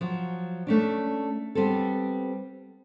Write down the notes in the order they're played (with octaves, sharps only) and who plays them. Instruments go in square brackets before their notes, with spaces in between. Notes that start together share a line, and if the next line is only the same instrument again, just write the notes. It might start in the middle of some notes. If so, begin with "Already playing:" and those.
[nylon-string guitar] F3 F#3
A3 C#4 D4
G3 B3 C4 A4